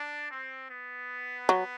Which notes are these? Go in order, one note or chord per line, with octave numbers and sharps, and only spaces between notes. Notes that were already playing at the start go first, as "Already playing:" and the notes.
Already playing: D4
C4
B3
F#3